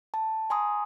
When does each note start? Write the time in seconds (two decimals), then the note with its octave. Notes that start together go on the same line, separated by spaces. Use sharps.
0.14 A5
0.50 G#5 A#5 C6 D#6